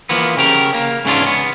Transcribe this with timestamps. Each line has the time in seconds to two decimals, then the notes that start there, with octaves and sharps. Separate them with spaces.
0.09 E3 F3 A#3 B3
0.37 C#3 G4 A#4
0.74 A#3
1.05 G#2 C#3 E3 C#4 D4 F4
1.26 B3